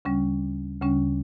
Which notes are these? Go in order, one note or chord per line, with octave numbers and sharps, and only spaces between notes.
D2 C#3 G3 C#4
D2 C#3 G3 C#4